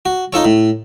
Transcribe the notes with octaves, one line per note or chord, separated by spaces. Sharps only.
F#4
D#4 F4 A4 C#5
A2